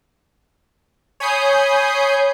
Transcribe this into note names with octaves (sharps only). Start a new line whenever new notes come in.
C#5 G#5 B5 D#6 G6 C7